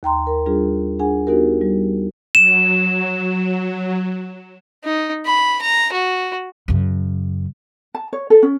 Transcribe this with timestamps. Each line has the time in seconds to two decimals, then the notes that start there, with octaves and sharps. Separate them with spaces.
0.03 D#2 G5 A#5 C6
0.27 A#4
0.46 G3 D4 F4 G#4
0.99 D4 G#4 F#5 G#5
1.27 B3 D#4 F#4 G4 A#4
1.61 G3
2.35 F#3 E7
4.84 D#4
5.26 B5
5.61 A#5
5.92 F#4
6.68 F#2 C#3
7.95 A5
8.13 C#5
8.30 A4
8.43 C#4